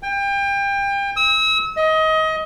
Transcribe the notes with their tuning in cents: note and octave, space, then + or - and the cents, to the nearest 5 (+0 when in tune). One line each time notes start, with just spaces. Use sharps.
G5 +30
E6 -35
D#5 +25